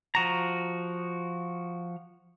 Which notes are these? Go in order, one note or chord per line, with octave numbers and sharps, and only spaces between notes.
F3 F#4 A#5